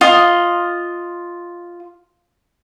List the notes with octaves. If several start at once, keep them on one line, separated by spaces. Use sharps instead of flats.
F4 D#5